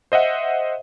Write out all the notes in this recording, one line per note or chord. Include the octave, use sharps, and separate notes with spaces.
C5 D#5 E5 F#5